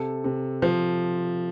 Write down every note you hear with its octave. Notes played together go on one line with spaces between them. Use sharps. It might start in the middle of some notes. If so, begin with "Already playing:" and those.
Already playing: C3 A4
C3
F3